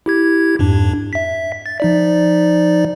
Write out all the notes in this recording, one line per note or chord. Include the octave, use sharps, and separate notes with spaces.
E4 G4 G#6
F2 G#2 D4
E5 B6
A6
F3 D#4 D5